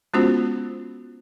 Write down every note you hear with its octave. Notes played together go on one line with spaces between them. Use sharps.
G#3 B3 C#4 F4 F#4 C5